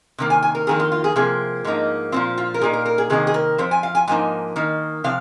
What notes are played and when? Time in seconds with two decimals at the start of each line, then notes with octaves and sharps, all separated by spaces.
0.18 C3 D#3 A#3
0.30 G#5
0.42 G#5
0.55 A#4
0.67 F2 D#3 A#3 G#4
0.79 F4
0.92 F4
1.04 G#4
1.16 C3 F3 A#3 G#4
1.64 G#2 F3 A#3 D#4
2.12 A#2 F3 C4 F4
2.38 F4
2.54 A#4
2.61 A#2 A#3 D#4 G#4
2.73 A#4
2.85 A#4
2.98 G#4
3.10 C3 D#3 A#3 D#4 G#4
3.27 G#4
3.34 A#4
3.58 F2 F3 C5
3.71 G#5
3.83 F5
3.95 G#5
4.07 G#2 F3 A#3 D#4 G#5
4.56 D#3 A#3 D#4
5.04 C3 F3 F5